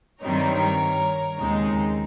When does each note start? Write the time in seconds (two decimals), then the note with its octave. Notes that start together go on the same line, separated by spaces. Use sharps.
0.23 G2 D#3 G3 C4 D#4 A#4 C#5
1.38 D#2 C#3 G#3 C4 D#4